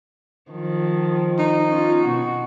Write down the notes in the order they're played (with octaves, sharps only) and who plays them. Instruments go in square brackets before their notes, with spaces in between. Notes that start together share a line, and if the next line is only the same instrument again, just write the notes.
[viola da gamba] D#3 F3
[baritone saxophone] D#4
[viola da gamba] C#4 F4
B2 F#4